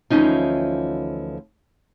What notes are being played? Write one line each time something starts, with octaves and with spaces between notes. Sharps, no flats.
D2 E3 F3 C#4 D#4 F4